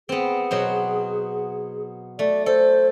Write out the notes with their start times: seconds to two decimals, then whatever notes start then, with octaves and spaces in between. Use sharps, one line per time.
0.09 B3 C4 G#4
0.51 B2 F#3 C5
2.19 A3 D5
2.46 A4 C5